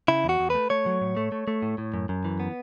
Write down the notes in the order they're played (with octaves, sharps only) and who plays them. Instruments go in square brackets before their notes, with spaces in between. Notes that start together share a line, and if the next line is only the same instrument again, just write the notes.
[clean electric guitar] C#3 E4
E2 F#4
E2
A3 B4
A3 C#5
F#3
A2
A3
A3
A3
A2
A2
F#2
F#2
E3
B3